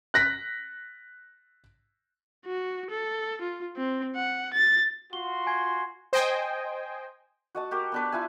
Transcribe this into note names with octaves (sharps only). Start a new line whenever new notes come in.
F#6 A#6 B6
F#4
A4
F4
C4
F#5
A6
F4 F#4 C6 G7
G#5 G#6 C7
C5 D#5 G5 G#5
F#4 D#5 A5
F#4 G4 A#4
B3 D4 B4
E4 F4 E5 G#5